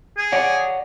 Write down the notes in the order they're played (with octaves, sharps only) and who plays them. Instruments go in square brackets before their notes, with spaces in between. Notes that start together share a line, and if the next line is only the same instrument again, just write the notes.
[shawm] G#4
[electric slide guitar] C#5 D5 F#5